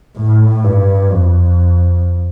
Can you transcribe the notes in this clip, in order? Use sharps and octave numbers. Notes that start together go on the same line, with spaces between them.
A2
G2
F2